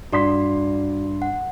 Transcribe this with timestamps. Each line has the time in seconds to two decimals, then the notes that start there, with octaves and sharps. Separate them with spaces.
0.12 G2 F#4 D5 C6 B6
1.22 F#5